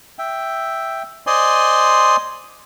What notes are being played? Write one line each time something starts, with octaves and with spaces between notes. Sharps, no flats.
E5 G5
C5 D5 D#5 G#5 C6